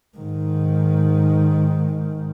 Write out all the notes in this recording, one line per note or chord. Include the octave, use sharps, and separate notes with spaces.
G#2 D#3